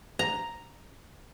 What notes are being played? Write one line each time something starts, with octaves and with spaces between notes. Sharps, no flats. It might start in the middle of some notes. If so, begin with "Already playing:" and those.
A#5